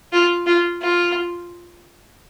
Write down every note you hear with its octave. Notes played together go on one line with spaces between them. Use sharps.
F4
F4
F4